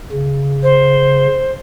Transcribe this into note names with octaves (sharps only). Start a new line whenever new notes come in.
C#3
C5